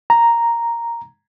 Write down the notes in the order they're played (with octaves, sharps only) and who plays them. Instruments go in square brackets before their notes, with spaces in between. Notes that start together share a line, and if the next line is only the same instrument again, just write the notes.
[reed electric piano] A#5